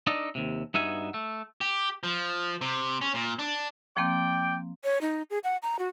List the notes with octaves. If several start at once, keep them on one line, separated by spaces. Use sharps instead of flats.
D4 D#4 A4 D5 D#5
D#2 C3
G2 B3 D#4 F#4 E5 G#5
A3
G4
F3
C3
C#4
A#2
D4
F3 A#3 C4 D5 G5
C#5
D#4
G#4
F#5
A#5
F#4